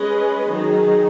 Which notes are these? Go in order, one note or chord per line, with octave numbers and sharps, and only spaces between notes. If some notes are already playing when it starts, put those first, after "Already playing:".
Already playing: G#3 C#4 G#4 B4 D#5
D#3 F#3 D#4 G#4